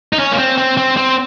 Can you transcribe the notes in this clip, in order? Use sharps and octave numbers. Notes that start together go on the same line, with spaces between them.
D#4
C#4
A#3
C4
C4
C4
C4